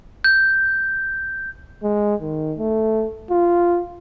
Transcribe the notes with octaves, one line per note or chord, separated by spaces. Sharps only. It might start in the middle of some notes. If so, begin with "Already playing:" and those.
G6
G#3
D#3
A3
F4